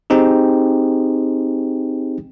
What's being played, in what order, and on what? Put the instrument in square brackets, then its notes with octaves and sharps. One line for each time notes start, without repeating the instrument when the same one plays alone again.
[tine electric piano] C4 D#4 G4 G#4